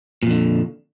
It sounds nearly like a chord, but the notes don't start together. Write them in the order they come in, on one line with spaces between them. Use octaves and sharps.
A#2 F2 D3